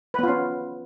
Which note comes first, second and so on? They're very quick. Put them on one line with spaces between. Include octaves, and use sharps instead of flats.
B4 B3 F4 C#4